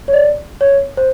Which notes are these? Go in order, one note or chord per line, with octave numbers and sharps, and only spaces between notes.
C#5
D5
C#5
C5